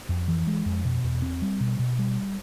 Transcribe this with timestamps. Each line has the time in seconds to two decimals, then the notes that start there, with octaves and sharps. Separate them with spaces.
0.09 F2
0.28 E3
0.47 G#3
0.66 F2
0.85 B2
1.04 E2
1.22 C4
1.42 G3
1.60 B2
1.79 B2
1.99 G3